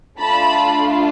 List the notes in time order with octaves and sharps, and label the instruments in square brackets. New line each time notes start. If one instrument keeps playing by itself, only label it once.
[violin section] A3 D4 F4 A5 B5